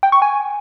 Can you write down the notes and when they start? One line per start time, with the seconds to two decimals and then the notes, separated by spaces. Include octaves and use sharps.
0.03 G5
0.12 C#6
0.22 G#5